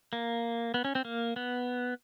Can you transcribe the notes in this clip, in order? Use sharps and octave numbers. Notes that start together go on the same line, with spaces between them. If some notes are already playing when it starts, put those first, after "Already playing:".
A#3
B3
C#4
C4
A#3
B3